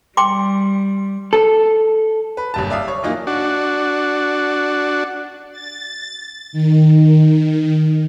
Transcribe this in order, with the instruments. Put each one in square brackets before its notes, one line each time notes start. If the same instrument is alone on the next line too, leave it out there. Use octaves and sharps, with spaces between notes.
[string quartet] G3 [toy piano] G5 C6 D6
[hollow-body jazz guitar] A4
[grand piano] B4
F#1 G2 A5
D5 E5 F5 D#6
C#5
E3 F#3 A#3 D#4 F4
[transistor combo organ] D4 F#4
[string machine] A6
D#3